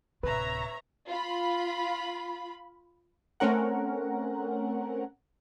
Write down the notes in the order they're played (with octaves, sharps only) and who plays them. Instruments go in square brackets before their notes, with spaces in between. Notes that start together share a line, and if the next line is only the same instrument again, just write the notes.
[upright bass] D1 C3 [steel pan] B4 [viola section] C#5 E5 A#5
[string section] F4 B5
[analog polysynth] A3 C4 C#4 A#4 F#5